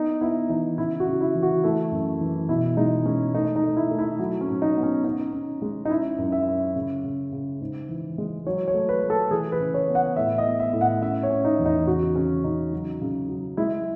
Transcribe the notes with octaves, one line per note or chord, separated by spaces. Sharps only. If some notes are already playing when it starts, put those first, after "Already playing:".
Already playing: B3 D#4
B3 E4
E3 D#4
C#3 E4
F#4
C#3
E4
E3
F#4
A3 E4
F#2
E3
B2 E4
G#3 D#4
G#3 C#4
A3 D#4
D#4
A3
E4
A3
E4
F#3
C#4
G#2
D#4
B3
C#4
C#4 D#4
C#4
G#3
D#4
C#4 E4
F#2
E5
C#4
C#3
C#3
C#3
G#2
E3
G#3
F#3 C#5
C#5
A3
B4
A3
A4
E3 G#4
B4
C#3
C#5
B3
F#5
A2 E5
D#5
B3
E5
A2
F#5
C#4 E5
C#5
C#4
D#4
E2
D#4
C#3 F#4
C#3 C#4
C#3 D#4
F#3
C#3
F#3
G#3 E4